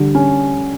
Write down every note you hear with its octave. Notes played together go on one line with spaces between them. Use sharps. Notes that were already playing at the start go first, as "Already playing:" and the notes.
Already playing: D3 G3
C#4